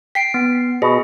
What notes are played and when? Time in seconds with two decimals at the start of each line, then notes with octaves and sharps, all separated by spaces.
0.15 G5 B6 C7 D7
0.34 B3
0.82 B2 G#4 D#5